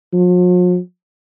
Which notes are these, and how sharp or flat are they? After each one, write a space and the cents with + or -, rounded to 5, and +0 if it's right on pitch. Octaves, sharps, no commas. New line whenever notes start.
F3 +45